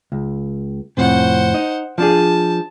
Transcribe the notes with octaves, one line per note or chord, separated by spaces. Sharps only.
C#2
F2 A2 C3 C5 F#5
D#4
F3 D4 G#4 A5